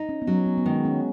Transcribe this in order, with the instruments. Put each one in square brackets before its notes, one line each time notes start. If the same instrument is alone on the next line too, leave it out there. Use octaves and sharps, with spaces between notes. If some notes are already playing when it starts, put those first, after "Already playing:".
Already playing: [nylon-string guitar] D#4
[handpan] C#4
B3
[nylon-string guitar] F#3 [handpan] C#4
[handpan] B3
B3
[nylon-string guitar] D#3 [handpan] G#3
[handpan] C#4